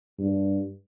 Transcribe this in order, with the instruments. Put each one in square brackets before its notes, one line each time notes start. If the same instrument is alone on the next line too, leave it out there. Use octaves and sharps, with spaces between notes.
[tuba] G2